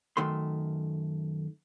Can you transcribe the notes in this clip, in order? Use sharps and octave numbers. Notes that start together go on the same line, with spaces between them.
F#2 D#3 A3 C6